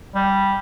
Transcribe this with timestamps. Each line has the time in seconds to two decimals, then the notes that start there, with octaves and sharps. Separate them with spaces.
0.15 G3